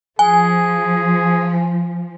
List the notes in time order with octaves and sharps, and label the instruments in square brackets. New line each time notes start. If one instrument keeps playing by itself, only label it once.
[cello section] F3 [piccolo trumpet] G#4 [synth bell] G#5